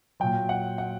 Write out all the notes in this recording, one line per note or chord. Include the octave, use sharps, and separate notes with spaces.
A#2 F#3 G5
F#5
F#5